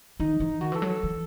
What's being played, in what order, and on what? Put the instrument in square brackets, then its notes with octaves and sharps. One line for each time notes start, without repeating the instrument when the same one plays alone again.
[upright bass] D#3 [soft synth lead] D#4
[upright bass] E3
[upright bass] D#3 [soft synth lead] F#4
[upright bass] E3 [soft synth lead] A4
[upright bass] F#3
[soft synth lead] A4
[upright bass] E3